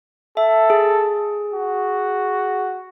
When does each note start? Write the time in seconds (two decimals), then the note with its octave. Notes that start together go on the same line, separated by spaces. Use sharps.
0.37 A4 E5
0.70 G#4
1.54 F#4